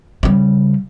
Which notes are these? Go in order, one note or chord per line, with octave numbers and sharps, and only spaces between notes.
C#3 G3